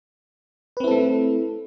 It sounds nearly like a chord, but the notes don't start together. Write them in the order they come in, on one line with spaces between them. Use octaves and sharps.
B4 C4 E4 A4 A3